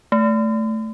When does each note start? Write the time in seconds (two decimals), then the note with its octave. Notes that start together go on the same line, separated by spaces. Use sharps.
0.12 A3